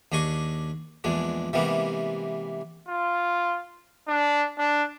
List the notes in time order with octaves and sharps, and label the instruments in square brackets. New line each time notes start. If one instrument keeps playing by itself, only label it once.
[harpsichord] D#2 D4 G#4 D#5 C#6
A#1 E2 G#3 D4
C3 E3 G3 G#3 A#3 B3
[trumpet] F4
D4
D4